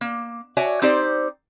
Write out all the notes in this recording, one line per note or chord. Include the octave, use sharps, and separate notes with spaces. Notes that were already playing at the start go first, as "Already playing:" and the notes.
A#3
F#4 C#5 D5 E5 G#5
C4 D#4 G4 C5 D5